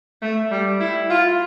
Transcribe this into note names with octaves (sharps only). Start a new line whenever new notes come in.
A3
G3
E4
F4